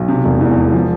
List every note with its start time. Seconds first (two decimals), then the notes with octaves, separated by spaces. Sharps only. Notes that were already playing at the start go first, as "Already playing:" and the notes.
Already playing: B1
0.08 C3
0.25 E1
0.41 E2
0.57 E1
0.73 F3